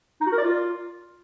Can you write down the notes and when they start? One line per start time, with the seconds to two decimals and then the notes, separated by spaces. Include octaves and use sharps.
0.21 D#4
0.27 F#4
0.32 A#4
0.38 D5
0.44 F4